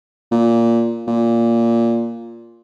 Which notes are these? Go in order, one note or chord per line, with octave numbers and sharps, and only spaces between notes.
A#2
A#2